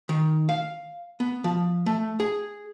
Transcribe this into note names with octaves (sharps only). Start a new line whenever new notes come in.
D#3
F5
B3
F3
A3
G#4